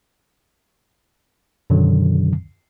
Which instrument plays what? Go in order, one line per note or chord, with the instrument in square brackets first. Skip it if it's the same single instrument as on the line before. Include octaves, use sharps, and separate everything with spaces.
[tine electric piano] F#2 B2 D3 D#3 F#3